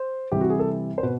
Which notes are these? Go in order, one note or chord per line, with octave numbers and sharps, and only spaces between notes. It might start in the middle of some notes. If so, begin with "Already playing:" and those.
Already playing: C5
C3 E3 G3 G4
F#4
G#4
A4
C5
B2 B4